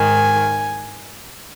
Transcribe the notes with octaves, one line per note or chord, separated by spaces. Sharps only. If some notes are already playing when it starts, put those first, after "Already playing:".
Already playing: G#2 D#3 G#5